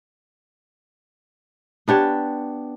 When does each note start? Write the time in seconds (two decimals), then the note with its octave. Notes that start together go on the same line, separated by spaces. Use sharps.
1.88 B3 D4 G4 C#5